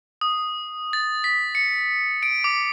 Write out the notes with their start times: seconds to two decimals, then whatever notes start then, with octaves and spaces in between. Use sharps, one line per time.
0.21 D#6
0.93 A6
1.24 B6
1.55 C#7
2.23 D7
2.44 D6